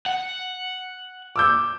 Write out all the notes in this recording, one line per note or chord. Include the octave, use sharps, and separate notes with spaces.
F#5
D6 E6 G6